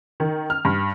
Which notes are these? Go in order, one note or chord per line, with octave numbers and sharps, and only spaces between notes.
D#3
F6
G2